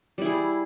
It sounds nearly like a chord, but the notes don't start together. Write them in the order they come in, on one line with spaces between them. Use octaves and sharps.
G3 E4 G#4